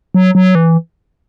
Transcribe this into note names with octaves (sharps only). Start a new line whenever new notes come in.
F#3
F#3
E3